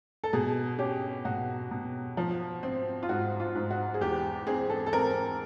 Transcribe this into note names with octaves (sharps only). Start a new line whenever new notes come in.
A4
B2 G#4
C#4 G4
B2 F#4
B2
F3
C4
F4
G#2 F#4
F4
G#2
F#4
G#4
E2 G4
C4 G#4
A4
A4
C4 A#4